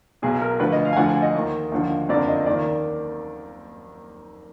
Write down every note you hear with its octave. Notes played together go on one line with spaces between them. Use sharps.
B1 B2 G#4
A#4
D2 D3 F3 B4
D#5
F5
G#5
D2 D3 F3 F#5
G#5
D#5
D#2 D#3
D#2 D3 F3
F#1 F2 D3 F3 D5
D#5
D#2 D#3 D5